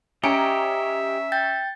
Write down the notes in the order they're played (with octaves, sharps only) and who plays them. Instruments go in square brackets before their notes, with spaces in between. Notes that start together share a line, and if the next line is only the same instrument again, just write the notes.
[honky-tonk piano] C#4 A#5 D7 [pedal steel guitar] G4 D#5 [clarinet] E5 [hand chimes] G#5 C#7
[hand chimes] G5 G6 A6